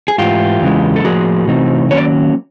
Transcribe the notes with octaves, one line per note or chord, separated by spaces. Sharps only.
G#4
G#2 E3 A3 F4 G4
E2 C#3 E3 G#3
A4
A2 F3 A#3 F#4 G#4
C3 E3 A3 C4 D#4
D#3 F#3 A#3 C#4 C#5
D5